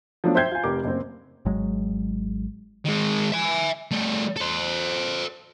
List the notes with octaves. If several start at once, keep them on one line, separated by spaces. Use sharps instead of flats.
F3 F#3 A3 B3 D4
C5 E5 G5 G6 G#6 C7
F4 G#5
F1 G4 A#4 D6
F#1 C4
G#1 F#3 G#3
D#3 G#3
E5 G#5
G3 A3
A4 C5